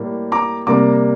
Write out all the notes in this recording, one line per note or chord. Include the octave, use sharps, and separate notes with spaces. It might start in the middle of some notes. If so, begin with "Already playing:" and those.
Already playing: A2 G3 A#3
A#5 D6
C3 G3 A#3 A#5 D6